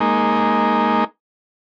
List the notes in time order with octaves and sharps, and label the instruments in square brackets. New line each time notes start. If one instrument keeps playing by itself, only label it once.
[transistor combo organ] G#3 A#3 D#4